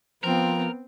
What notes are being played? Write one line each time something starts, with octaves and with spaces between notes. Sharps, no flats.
F3 B3 C4 A#4